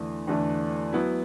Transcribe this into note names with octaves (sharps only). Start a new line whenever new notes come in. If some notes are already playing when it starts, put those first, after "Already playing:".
Already playing: E2 D3 A3 D4
E2 D3 A3 D4
F#3 B3 E4